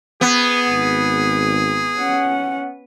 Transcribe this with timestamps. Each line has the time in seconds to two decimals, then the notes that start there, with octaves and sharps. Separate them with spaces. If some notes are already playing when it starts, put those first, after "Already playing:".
0.21 B3 G#4
0.67 G#1
1.98 C#4 F#5